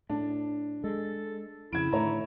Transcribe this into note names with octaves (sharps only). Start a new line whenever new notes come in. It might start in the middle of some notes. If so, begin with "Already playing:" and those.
A2 D4
G#3 A4
F2 C#3 E4 G#6 D7
A2 D3 D#3 A3 C#5 A#5